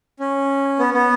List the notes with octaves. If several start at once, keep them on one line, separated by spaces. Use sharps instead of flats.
C#4
B3
B3